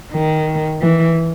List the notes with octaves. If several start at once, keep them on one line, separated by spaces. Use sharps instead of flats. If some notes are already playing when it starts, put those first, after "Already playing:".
D#3
E3